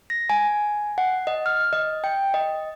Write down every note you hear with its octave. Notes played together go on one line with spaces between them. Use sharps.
A#6
G#5
F#5
D#5
F6
D#5
G5
D#5